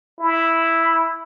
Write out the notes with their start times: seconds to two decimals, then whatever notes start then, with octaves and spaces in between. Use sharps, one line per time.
0.20 E4